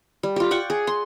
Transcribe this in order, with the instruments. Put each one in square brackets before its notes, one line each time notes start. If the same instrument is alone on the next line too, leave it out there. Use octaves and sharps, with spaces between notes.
[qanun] G3
F4 G4
D5 F#5 G5 C#6
G#4
C6